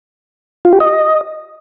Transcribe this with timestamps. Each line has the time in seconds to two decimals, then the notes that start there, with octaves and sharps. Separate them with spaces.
0.65 F4
0.73 G4
0.80 D#5